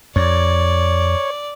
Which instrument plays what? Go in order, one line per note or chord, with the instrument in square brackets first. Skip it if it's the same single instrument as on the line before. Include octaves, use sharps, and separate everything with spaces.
[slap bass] F2 [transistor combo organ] C#5 [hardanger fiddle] D5